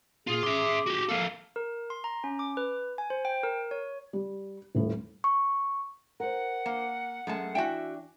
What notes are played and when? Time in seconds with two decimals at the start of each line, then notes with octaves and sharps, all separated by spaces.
0.27 A#2 F4 G#4
0.43 E5 C6 D6
0.86 F#4 G4
1.09 A#3 A4 F5
1.56 A#4
1.90 C6
2.04 A#5
2.24 C#4
2.39 D6
2.57 B4
2.98 G#5
3.10 C5
3.25 G5
3.43 A#4
3.71 C#5
4.13 G3
4.75 D#1 A2
5.24 C#6
6.20 A#4 C5 F#5
6.66 A#3
7.27 F#2 G#3 A3 A5
7.55 E3 D4 F#4 E5 G5 G#5